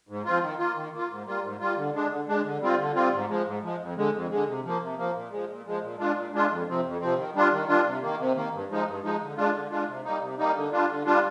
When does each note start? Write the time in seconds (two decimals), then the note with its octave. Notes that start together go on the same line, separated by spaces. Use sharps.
0.09 G#2
0.25 F3 C4 F4
0.41 D#3
0.59 A#3 F4
0.75 D#3
0.93 A#3 F4
1.10 G#2
1.26 G3 A#3 F4
1.43 G#2
1.60 G3 A#3 F4
1.77 D3
1.94 G#3 D4
2.11 D3
2.28 G#3 D4
2.44 D3
2.61 G3 C4 F4
2.79 D3
2.95 G3 C4 F4
3.13 G#2
3.29 F3 G#3
3.46 G#2
3.63 F3 G#3
3.80 F2
3.96 D3 G#3
4.14 F2
4.30 D3 G#3
4.47 C3
4.64 F3 A#3
4.81 C3
4.97 F3 A#3
5.15 A#2
5.31 F3 G#3
5.49 A#2
5.66 F3 G#3
5.82 A#2
5.99 G#3 D4 F4
6.17 A#2
6.33 G#3 D4 F4
6.49 F2
6.67 C3 F3 C4
6.84 F2
7.01 C3 F3 C4
7.17 D#3
7.35 G3 D4 F4
7.52 D#3
7.68 G3 D4 F4
7.86 C3
8.02 D#3 A#3
8.19 C3
8.35 D#3 A#3
8.53 G2
8.70 F3 G#3 D#4
8.86 G2
9.03 F3 G#3 D#4
9.21 D3
9.36 G#3 D4 F4
9.54 D3
9.70 G#3 D4 F4
9.87 C3
10.04 G3 A#3 D#4
10.21 C3
10.38 G3 A#3 D#4
10.55 D3
10.72 G3 D4 F4
10.89 D3
11.05 G3 D4 F4